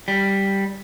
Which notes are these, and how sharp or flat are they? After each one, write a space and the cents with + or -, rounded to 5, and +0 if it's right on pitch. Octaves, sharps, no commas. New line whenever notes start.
G3 +0